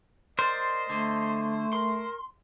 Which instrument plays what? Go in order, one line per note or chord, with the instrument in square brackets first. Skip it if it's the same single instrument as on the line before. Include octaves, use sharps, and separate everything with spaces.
[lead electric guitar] A#4 D5 [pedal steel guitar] C5 [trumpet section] D#5 C6
[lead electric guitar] D3 [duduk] A3
[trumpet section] A#4 [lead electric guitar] C6